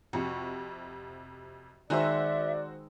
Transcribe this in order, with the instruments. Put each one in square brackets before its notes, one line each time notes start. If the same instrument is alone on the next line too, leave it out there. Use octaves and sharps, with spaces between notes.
[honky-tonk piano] F2 C3 [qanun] F#4
[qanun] D#3 G#3 [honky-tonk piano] F#4 C5 E6 [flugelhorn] D5 [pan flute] E5